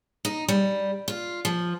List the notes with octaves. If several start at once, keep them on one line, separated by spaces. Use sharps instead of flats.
D#4
G3
F4
F3